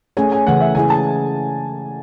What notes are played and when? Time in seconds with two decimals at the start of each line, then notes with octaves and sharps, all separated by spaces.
0.17 A3 C#4 G#4 C#5 G#5
0.32 G#5
0.47 C#3 E3 A3 F#5
0.60 E5
0.75 C#3 G#3 C#4 E4 G#4 G#5
0.90 A5